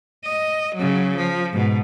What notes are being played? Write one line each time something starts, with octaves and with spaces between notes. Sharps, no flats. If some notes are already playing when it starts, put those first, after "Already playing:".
D#5
C#3 F#3
F3
G#2 B2